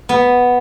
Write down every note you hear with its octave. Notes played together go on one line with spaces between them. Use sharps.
B3